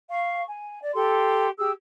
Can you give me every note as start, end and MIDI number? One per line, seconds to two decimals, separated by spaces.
0.10 0.42 77
0.10 0.42 85
0.49 0.79 80
0.81 0.91 74
0.93 1.48 67
0.93 1.48 69
0.93 1.48 84
1.57 1.70 67
1.57 1.70 68
1.57 1.70 88